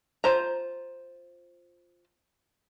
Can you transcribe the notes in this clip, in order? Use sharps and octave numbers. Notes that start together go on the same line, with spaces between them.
F4 C5 A#5